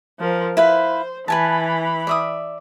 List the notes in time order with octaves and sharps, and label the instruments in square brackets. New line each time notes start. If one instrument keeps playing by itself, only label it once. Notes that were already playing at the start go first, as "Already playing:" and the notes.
[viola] F3 A#4
[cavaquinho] E4 B4 F5 [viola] C5
[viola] E3 B5 [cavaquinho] B4 G#5 A5
[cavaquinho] D5 E5 D#6